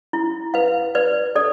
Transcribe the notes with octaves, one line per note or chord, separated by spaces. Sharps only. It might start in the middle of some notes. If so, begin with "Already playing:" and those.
E4
B4 F5
B4 D5
A4 D5